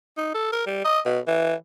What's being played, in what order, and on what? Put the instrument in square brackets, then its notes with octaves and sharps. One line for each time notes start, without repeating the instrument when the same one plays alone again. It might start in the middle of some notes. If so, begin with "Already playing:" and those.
[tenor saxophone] D#4
A4
A#4
G3
D#5
B2
E3